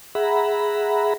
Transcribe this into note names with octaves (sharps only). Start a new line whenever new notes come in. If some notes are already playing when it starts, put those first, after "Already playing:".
G#4 E5 F#5 A#5 B5